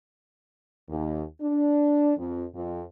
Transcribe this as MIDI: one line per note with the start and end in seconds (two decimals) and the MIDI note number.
0.89 1.22 39
1.42 2.13 62
2.17 2.43 41
2.55 2.82 41